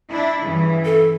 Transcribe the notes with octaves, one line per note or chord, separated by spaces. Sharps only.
D4 E4
G2 C#3 E3
A4